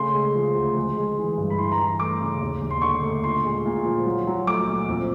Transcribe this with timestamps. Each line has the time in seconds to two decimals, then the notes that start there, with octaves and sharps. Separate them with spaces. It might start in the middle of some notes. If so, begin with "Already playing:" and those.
Already playing: C#3 A3 C6
0.14 G#3
0.35 F3
0.56 D2
0.76 G#3
0.97 G#3
1.18 E3
1.38 G2
1.50 B5
1.58 E3 C6
1.72 A#5
1.79 E3
2.00 A3 D6
2.20 C#3
2.41 D#2
2.62 D#2
2.71 C6
2.82 D3 C#6
3.02 A3
3.24 A#2 C6
3.44 G#3
3.65 A#2
3.85 F3
4.06 F#3
4.27 F#3
4.47 A3 D6
4.67 A#2
4.88 F2